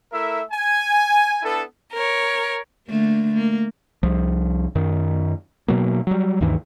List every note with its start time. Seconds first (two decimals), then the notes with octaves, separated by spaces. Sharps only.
0.12 A3 E4 A#4 E5
0.51 G#5
1.42 B3 D4 E4 A4
1.93 A#4 C#5
2.88 D3 A3 A#3
3.34 A#3
4.03 C2 F3
4.75 F#2 D#3
5.68 B2 F#3 A#3
6.07 F#3 G3
6.41 D2 G2 D#3 E3